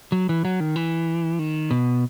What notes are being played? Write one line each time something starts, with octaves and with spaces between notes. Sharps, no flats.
F#3
E3
F#3
D#3
E3
D#3
B2